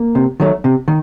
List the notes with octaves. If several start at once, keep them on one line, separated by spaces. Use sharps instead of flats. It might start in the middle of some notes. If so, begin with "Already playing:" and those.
Already playing: A#3
C3
D#3 F#3 A3
C3
D#3